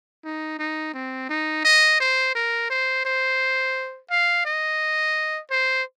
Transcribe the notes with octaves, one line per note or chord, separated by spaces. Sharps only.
D#4
D#4
C4
D#4
D#5
C5
A#4
C5
C5
F5
D#5
C5